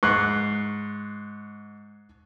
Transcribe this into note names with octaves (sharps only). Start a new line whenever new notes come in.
G#2 C#6 F#6 C7